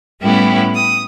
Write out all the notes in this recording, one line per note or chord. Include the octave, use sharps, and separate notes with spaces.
A2 G3 B3 C#4 E4 G4
D#6